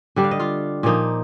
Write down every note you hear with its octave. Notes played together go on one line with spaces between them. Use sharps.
D3 G3 D4
F5
D#5
F4 F5
A#2 F3 A#3 D#4